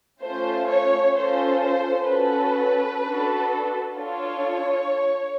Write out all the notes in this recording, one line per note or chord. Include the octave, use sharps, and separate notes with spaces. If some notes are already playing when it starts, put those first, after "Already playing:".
A3 C#4 F4 C5
C#5
C#4 F4 A4 C5
C5
C#4 F#4 A4 B4
D4 F#4 A4
D4 F4 A4 C#5